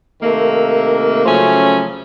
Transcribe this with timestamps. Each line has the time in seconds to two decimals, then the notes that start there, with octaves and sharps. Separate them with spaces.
0.23 C3 D#3 A3 A#3
1.26 C#3 F3 F#3 A3 C#4